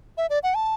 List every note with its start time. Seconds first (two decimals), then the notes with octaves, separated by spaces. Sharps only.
0.17 E5
0.30 D5
0.43 F#5
0.56 A5